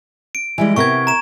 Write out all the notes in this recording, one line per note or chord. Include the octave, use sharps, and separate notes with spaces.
D7
E3 G3 G#3
C3 B3 A#4 C#6 G#6
A#5 E7